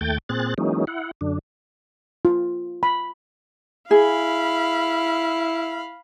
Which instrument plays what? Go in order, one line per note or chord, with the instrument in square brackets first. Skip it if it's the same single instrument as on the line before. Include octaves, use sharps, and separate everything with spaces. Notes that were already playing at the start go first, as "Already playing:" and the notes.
[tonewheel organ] D#2 A3 G5 G6 A6
A#2 C4 G#4 F#6 A6
E3 F#3 G#3 A#3 C#4 D#4
E4 F#5
F#2 D3 D4
[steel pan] F4
B5
[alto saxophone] E4 [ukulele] G#4 [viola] F5 B5